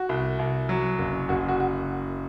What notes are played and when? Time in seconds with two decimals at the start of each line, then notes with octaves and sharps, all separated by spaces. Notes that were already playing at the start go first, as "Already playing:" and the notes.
Already playing: F#4
0.09 C2
0.39 C2
0.69 F#3
0.99 F#1
1.29 F#1 F#4
1.48 F#4
1.60 F#4